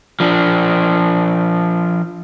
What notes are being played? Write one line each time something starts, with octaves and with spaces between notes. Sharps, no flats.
F3 D4